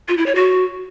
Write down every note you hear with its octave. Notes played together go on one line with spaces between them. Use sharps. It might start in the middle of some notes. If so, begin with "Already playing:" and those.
F4
E4
C#5
F#4